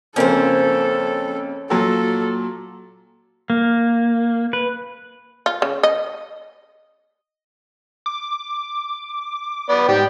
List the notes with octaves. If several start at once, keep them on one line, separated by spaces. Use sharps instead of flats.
F2 C#3 A#3 C#4 A4 C5
A#2 F#3 A4
A#3
B4
F4
C#3
D#5
D6
B3 D5
G#2 G4 D5 G5